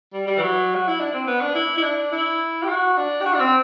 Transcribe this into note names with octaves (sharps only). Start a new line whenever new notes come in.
G3
G3
E3
F#3
F#4
E4
D4
C4
B3
D4
E4
E4
D4
E4
G4
F#4
D4
G4
F#4
D4
C4